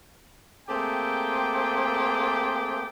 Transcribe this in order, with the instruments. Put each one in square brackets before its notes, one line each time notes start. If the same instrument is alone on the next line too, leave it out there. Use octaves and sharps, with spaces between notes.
[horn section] A3 A#3 C4 G4 G#4 G5